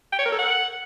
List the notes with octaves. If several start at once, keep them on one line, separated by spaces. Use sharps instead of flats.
G5
C#5
A#4
A4
F#5